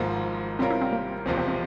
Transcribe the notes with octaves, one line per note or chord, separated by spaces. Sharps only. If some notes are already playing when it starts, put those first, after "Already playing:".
Already playing: G#1 G#2 F3 A#3
C3 G3 C4 C#4 F4 A#4
E4
C4
A#3
E1 E2 C3 F3 C4
C4
C4